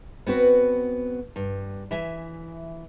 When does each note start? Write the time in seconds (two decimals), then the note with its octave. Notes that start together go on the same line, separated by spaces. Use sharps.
0.27 B3 C4 F#4 B4
1.36 G2
1.91 E3 E5 G#5